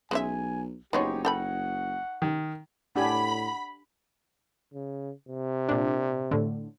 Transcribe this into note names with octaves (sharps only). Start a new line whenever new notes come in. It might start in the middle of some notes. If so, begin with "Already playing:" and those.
B1 G#3 C#4 E5 G#5
F#1 F3 G#3 B3 D#4 G4 C#5
A4 F#5 G5 B5
D#3
A2 D4 G4 F#5 G#5 B5
C#3
C3
A#2 D4
A2 D3